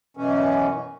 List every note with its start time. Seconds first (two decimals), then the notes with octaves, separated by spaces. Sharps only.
0.17 F#2 B2 E3 C#4